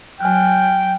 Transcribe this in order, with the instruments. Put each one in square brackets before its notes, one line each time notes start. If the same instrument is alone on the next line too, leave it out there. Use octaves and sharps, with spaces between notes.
[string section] F#3 [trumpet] G5 [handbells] G#5 F6 F#6